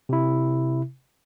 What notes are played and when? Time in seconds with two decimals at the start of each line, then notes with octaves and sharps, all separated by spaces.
0.09 C3 E4